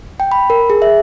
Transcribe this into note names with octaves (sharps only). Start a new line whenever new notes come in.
G5
B5
A#4
G#4
E5